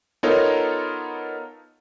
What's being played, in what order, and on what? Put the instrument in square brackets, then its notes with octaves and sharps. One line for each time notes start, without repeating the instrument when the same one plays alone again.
[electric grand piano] B3 D#4 F4 A4 A#4 C#5